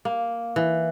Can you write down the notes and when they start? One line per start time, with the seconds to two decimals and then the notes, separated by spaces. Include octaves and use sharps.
0.05 A#3
0.56 E3